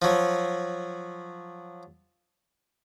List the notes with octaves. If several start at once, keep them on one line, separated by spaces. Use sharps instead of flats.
F3 F#3